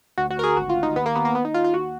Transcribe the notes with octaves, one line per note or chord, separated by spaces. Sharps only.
D2 F#4
F#4
D2 A#4
G#4
G#1 F#4
F4
G#1
D#4
D#2 B3
A#3
D#2 B3
A#3
D#2 B3
D#4
D#3 F4
F4
D#2 F#4